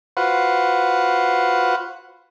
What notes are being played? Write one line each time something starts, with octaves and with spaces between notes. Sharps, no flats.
F4 F#4 B4 C5 F#5